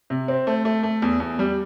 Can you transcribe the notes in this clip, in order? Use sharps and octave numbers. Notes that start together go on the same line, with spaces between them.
C3
C4
A3
A3
A3
E2
E2
G3